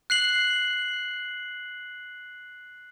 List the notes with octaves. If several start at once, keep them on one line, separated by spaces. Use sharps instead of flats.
F#6 C7 F#7